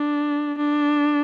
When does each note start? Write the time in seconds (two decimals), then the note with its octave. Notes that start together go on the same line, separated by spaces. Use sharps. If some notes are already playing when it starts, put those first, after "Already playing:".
Already playing: D4
0.58 D4